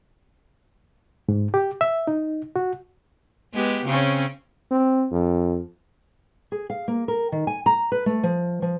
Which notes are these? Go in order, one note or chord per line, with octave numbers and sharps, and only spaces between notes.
G#2
G4
E5
D#4
F#4
G#3 B3 G4
C#3 C4 C#4
C4
F2
G#4
F5
A#3
A#4
D#3
G#5
A#5
B4
A3
F3
F3